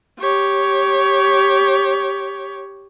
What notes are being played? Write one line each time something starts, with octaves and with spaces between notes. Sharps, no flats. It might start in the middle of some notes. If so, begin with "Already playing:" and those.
G4 C#5